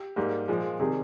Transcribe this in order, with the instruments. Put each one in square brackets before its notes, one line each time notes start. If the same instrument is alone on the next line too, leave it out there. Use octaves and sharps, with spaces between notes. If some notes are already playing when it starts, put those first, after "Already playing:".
Already playing: [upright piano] G4
G#2 G3 A#3
A#2 F3 G#3
C3 D#3 G3 G#4